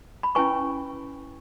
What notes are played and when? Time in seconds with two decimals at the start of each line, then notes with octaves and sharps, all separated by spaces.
0.23 B5
0.35 C#4 E4 B4 G#5 C#6